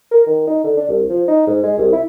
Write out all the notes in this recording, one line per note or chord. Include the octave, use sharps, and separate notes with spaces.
A#4
D#3
D#4
D3
D4
C2
F3
D#4
G#2
G#3
C2
E4